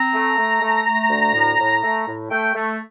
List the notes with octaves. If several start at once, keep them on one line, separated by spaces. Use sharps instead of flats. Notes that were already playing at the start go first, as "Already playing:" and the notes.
Already playing: C4 A#5
A3
A3
A3
A3
D2
A2
A2
A3
A2
A3 G5
A3